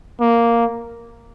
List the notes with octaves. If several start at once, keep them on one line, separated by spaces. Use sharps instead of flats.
A#3